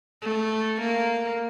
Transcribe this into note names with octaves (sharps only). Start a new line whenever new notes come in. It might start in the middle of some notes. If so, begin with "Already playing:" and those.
A3
A#3